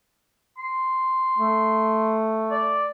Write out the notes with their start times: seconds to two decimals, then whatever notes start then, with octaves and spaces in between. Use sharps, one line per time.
0.58 C6
1.39 A3
2.51 D5